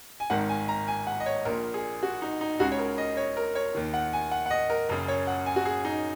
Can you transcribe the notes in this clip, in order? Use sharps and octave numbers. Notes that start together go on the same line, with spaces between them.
G#5
G#1 G#2 D#3 F#5
G#5
A#5
G#5
F#5
D#5
C#5
A#1 A#2 A#4
G#4
F#4
D#4
D#4
C#2 C#3 F#4
C#5
A#4
D#5
C#5
A#4
C#5
D#2 D#3
F#5
G#5
F#5
F#5
D#5
A#4
F#1 F#2 C#3 A#4
C#5
F#5
G#5
F#4
G#4
D#4